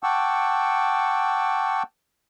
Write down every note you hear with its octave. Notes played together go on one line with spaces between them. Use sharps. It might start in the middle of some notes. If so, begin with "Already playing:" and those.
F#5 G5 A5 C#6 D6 E6